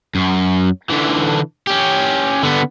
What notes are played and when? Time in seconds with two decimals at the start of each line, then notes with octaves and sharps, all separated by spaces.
0.15 F#2
0.90 D3 E3
1.67 C#4 G4
2.43 D3 B3